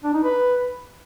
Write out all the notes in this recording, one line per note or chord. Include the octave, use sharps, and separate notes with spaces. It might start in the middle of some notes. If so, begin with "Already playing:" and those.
D4
D#4
B4